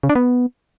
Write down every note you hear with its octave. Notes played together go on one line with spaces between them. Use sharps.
C#3
D4
B3